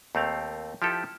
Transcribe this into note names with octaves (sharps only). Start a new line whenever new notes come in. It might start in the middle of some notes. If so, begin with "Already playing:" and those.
D#2 A3 C4 F5
F3 E4 G4 A4